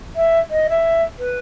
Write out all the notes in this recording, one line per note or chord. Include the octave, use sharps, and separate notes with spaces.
E5
D#5
E5
B4